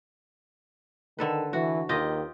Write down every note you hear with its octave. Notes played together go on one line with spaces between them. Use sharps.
D3 D#3 A4 B4
E3 F#4
D#2 F4 G4 D#5